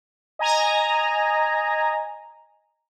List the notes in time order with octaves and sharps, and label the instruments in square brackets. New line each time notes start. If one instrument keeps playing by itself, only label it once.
[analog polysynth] D#5 G#5 A#5